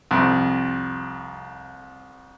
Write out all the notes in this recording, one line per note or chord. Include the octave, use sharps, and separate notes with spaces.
C2 F2